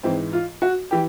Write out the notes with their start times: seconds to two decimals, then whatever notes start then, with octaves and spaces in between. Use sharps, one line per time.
0.03 G#2 E3 C4
0.33 F4
0.62 F#4
0.91 E3 G4